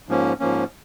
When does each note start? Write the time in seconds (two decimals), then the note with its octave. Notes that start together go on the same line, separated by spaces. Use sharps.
0.09 G#2 F3 A#3 C#4
0.39 G#2 F3 A#3 C#4